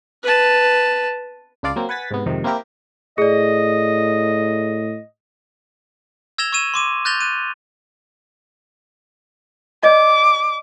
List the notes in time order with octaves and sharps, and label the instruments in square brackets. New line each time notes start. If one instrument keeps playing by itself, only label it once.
[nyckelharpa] B4 A5
[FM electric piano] C#2 D4 F4 D5 F5
F#3 A#3 C4
B4 F#5 G#5 A6 B6
G#2 C3 B3
F2 G#2 C3 D#3
A#3 C4 E4 G4 A#4
[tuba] A2 [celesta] G#4 D5 [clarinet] D#5
[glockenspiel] E6 G#6 A#6 E7 F7 G7
C#6 E6 G#6 D#7 E7
C6 D6 D#7
F#6 G6 A6 A#6 F7 G7
F#6 D#7
[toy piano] D5 D#5 [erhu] D6